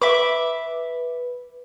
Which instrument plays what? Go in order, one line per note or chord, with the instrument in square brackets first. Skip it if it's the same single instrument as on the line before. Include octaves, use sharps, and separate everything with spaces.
[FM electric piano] B4 [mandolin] E5 B5 D6